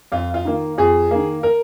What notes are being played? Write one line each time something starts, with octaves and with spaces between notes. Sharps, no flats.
F2 F4
F4
D#3 A#3
F2 G#4
D#3 A#3
A#4